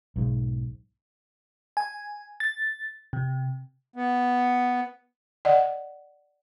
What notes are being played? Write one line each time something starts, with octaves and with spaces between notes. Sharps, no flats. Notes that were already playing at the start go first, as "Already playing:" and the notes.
B1 G#2
G#5
A6
C3
B3
D5 D#5 F#5